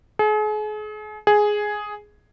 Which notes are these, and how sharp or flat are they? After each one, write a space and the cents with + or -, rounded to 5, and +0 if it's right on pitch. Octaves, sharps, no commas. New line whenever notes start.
G#4 +40
G#4 +5